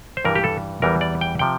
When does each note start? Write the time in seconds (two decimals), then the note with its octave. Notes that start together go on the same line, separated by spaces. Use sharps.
0.17 C5
0.25 G2 E3 G3 A#4
0.35 G4
0.44 A4
0.82 E2 E3 G3 A#4
1.01 D5
1.21 G5
1.39 C3 F3 G5